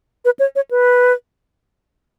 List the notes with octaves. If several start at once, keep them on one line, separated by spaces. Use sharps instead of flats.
B4
C#5
C#5
B4